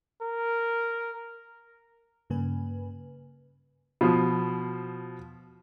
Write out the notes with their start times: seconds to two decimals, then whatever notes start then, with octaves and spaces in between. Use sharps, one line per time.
0.22 A#4
2.30 G2 C#3 A#3 B4 G#5
4.01 B2 F3